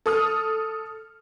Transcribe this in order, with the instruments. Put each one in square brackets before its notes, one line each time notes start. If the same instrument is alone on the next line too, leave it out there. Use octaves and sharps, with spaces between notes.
[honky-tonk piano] A4 D#6 F6